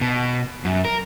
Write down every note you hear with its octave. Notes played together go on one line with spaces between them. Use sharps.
B2
F#2
A#4